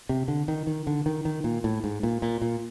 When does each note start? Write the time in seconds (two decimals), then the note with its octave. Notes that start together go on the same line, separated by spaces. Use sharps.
0.09 C3
0.28 D3
0.48 D#3
0.67 D#3
0.87 D3
1.06 D#3
1.25 D#3
1.44 A#2
1.64 A2
1.84 G#2
2.03 A#2
2.22 A#2
2.42 A#2